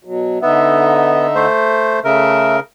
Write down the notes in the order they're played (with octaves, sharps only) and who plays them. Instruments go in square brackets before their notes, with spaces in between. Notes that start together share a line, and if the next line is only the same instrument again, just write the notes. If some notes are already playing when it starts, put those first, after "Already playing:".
[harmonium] B2 F#3
[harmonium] D3 D#4 E5 [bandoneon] B3
[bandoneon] A3 C5
[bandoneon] C#3 A#4 [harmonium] A3 E5